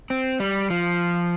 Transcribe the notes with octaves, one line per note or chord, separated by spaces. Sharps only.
C4
G3
F3